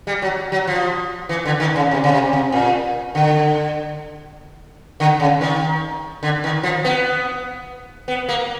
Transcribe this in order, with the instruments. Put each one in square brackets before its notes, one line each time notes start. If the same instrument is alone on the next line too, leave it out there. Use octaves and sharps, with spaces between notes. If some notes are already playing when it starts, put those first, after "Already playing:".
[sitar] G3
F#3
F#3
F3
E3
D3
D#3
C#3
C3
C#3
C3
C3
A#2
D3
D3
C#3
D#3
D3
D#3
F3
B3
B3
A#3